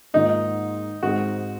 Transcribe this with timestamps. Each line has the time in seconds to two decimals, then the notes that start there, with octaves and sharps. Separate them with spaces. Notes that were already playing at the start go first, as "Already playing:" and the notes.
0.14 G#2 D#3 A#3 D#4 F4
1.03 G#2 D#3 G#3 C4 F#4